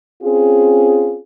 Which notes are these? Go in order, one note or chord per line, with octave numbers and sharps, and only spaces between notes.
C4 C#4 F4 G#4